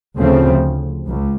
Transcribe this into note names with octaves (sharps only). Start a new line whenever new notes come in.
D2 C#3 F3 A3 C4
C#2